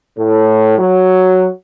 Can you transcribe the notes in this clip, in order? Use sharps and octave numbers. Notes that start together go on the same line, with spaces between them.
A2
F#3